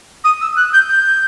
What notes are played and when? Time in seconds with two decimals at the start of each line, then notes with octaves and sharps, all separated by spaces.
0.24 D#6
0.41 E6
0.57 F#6
0.73 G6
0.90 G6